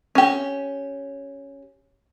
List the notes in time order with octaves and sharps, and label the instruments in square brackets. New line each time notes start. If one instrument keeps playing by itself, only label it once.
[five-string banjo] C#4 G4